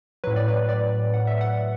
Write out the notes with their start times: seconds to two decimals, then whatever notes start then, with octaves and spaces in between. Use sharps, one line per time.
0.24 A2 F#3 B4
0.36 D5
0.48 B4
0.69 D5
1.14 F#5
1.27 E5
1.41 F#5